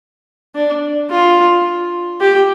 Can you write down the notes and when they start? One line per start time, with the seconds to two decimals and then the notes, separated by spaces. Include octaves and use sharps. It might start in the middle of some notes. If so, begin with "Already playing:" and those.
0.55 D4
1.10 F4
2.20 G4